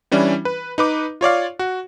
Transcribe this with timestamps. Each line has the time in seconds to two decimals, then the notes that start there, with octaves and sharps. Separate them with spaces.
0.11 E3 G3 C#4 D4 E4
0.45 B4
0.78 D#4 B4 D6
1.21 F4 C#5 D5 F5
1.59 F#4